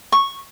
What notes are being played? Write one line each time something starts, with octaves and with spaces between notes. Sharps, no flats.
C#6